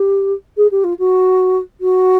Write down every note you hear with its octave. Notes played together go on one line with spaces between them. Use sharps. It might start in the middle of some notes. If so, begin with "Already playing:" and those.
Already playing: G4
G#4
G4
F4
F#4
F#4